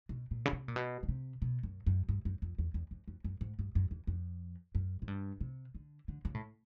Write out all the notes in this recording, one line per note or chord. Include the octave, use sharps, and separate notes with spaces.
B2
A#2
C#3
C3
A#2
B2
C#3
C3
B2
F#2
F#2
G2
F#2
F2
E2
E2
F2
F2
F#2
G#2
G2
F#2
E2
F2
F#2
G#2
G2
C3
D3
D3
C#3
A2